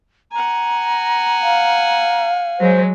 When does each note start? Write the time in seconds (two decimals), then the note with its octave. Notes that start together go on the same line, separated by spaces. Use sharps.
0.32 F#5 G#5 A#5
1.42 F5
2.60 F#3 G#3 C5